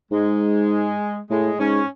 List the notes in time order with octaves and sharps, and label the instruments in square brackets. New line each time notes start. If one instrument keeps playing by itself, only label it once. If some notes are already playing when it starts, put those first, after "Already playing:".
[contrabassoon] G#2 [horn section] G#3
[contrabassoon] A2 [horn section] G#3
[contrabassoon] G#2 [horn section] C#4